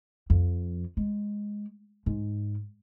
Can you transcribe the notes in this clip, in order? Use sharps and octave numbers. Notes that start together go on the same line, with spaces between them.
F2
G#3
G#2